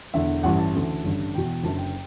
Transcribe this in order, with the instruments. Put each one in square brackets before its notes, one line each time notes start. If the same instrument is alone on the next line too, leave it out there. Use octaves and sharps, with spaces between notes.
[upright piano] E1 E2 D3 E5
A1 G2 E3 F#5
A5
D2 C#3 E3
A1 G2 D3
E1 E2 B2 G5
F#1 F#2 D3 A5
G5